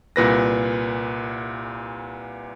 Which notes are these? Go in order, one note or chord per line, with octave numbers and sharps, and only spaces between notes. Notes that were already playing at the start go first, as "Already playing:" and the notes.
C2 A#2 B4 A#6